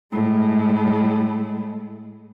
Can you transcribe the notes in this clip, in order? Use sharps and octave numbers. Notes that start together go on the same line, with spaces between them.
A2 G#3